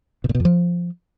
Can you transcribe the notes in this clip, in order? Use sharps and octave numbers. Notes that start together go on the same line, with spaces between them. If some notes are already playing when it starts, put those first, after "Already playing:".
B2
A#2
B2
F2
F3